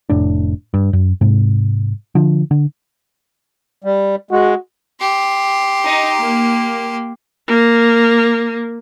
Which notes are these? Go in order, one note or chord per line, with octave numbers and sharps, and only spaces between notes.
F1 A2 D4
G2
F#2
G#2 C3
D3 F3
D3
G3
G#3 F#4
G4 C6
D#4
A#3
A#3